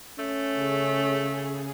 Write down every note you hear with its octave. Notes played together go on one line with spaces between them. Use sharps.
A3 C#4
C#3 G#4